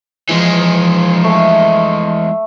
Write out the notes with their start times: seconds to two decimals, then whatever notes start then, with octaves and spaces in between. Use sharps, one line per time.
0.29 E3 F3 G#3
1.23 A3